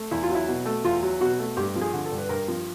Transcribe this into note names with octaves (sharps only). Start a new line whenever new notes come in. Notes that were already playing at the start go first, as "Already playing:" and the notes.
Already playing: A3
E2 E4
F4
F#3
E4
B2
A3
E2 F4
F#3
B2 F#4
A3
G2 G4
F3
G#4
D3
A4
G2
B4
G2 A#4
F3